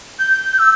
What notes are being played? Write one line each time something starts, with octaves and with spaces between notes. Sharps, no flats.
G6
E6